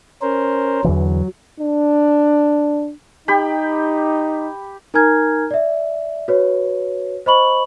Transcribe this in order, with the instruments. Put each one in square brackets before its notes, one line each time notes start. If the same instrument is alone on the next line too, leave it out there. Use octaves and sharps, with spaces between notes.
[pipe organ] C#4 A#4 C5
[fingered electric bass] E2 D3 E3 [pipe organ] F#3
[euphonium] D4
[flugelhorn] D#4 [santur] G4 G5 B5
[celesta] D#4 A#4 G#5 A#5 F6 G#6
D5 E5
F#4 B4 C#5
C5 D#5 B5 C#6 F#7